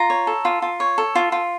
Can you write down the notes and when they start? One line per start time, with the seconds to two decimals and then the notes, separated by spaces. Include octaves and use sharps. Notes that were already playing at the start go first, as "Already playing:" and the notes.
Already playing: F4 A#5
0.10 C#5
0.27 A4
0.45 F4
0.62 F4
0.80 C#5
0.98 A4
1.15 F4
1.32 F4